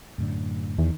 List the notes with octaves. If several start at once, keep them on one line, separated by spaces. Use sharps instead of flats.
F#2 A2 D3
E2 D#3